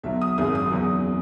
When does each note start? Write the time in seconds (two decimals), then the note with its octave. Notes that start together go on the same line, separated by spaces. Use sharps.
0.03 B1 B2 F#3 E5
0.21 D#6
0.38 G#1 F#2 C#3 F#3 D#6
0.55 D#6
0.71 E2 C#3 F#3